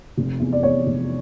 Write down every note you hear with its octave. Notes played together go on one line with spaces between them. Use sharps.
F1
E2
D5
E2 C#5
F1